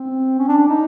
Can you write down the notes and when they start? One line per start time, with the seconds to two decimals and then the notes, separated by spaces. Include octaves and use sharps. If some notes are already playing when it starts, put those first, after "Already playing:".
Already playing: C4
0.39 C#4
0.48 D4
0.59 D4
0.69 D#4